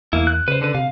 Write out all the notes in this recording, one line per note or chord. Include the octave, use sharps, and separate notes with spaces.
E2 A#3 E4
F#6
C#3 B4 C5
D3 B4
C3 F5